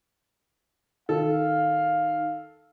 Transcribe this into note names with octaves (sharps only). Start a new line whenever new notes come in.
D#3 A4 F5